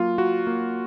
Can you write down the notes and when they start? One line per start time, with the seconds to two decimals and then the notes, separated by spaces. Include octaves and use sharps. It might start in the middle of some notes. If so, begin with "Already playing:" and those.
Already playing: F#3 A#3 F4
0.18 A#3 F#4
0.47 A#3